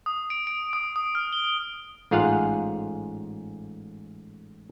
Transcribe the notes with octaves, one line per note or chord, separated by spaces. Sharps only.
D#6
D7
D7
D#6
D#6
F6
G7
A1 G#2 F4 G#4 F5 F#5